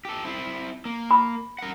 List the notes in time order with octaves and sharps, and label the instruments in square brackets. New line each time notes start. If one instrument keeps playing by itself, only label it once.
[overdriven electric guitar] G4 A4
C4 E4
A#3
[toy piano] B5
[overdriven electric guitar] A#4 F#5